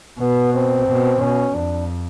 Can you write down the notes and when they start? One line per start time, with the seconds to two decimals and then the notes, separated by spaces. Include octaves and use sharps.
0.20 B2 B3
0.54 C4
0.87 B2
1.20 B2 C#4
1.54 F2 D4